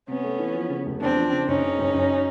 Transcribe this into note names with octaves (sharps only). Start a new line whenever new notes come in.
C3 B3 C#4
A3
E3
F3
C#3
F1
E2 C4 D4
F3
C#3
F#1 C#4 D#4
C#3
F#1
F#2